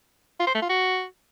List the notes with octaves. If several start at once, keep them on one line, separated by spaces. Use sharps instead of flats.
F4
C5
A3
F4
F#4